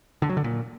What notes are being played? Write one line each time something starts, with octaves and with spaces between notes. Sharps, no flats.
D3
F#3
D3
A#2